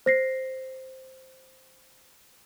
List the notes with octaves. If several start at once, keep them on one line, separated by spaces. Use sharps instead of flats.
C5 A#6 C7